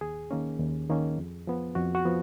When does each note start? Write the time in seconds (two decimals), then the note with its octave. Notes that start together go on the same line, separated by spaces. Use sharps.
0.01 D#2 G#4
0.31 D#3 A#3 C#4
0.59 D#2
0.89 D#3 A#3 C#4
1.18 F2
1.47 F3 B3
1.75 F2 F#4
1.95 F#4
2.05 F3 B3